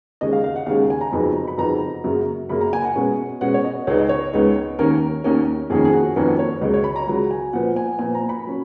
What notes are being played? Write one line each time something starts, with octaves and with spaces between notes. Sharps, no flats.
D#2 C#3 G#3 C#4 D#5
F5
F5
F#5
D#2 C#3 G#3 C#4 F5
F#5
G#5
A#5
F2 C#3 F#3 B3 D#4 B5
A#5
B5
F2 C#3 F#3 B3 D#4 A#5
F#2 C#3 F#3 A#3
F#2 C#3 F#3 A#3 B5
A#5
G#5
F#5
B2 G#3 C#4
B2 G#3 C#4 F#5
C#5
D#5
C#2 C#3 G#3 B3 D#4 C#5
D#5
C#5
C#2 C#3 G#3 B3 D#4
D#2 D#3 A#3 C#4 A#4
D#2 D#3 A#3 C#4
F2 D#3 A#3 C#4 G#4
G#4
F#4
F2 D#3 A#3 C#4 B4
C#5
C#2 C#3 F#3 D#5
C#5
B5
A#5
C#2 C#3 F#3 A#5
G#5
A#2 F3 B3 F#5
G#5
A#2 F3 B3 G#5
A#5
B5
F#3 C#4